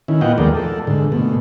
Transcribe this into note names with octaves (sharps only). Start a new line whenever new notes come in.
D#3 C#4 E4
A#2 B3 F4 D#5 F#5 G5
D#2 F3 G#3 A3 A#4 D5
A4
G#2 D3
B2 A3